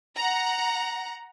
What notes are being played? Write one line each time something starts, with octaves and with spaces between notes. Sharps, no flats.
F#5 A#5